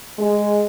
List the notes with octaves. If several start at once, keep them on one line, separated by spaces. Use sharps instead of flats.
G#3